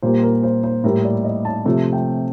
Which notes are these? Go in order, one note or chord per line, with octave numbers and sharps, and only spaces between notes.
A#2 G3 A#3 C5
A#4
C5
C5
A2 G3 A#3 A#4
D5
D#5
A5
C3 F3 A3
G5